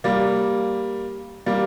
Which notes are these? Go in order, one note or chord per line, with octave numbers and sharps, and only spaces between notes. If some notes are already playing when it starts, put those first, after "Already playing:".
G3 A#3
G3 A#3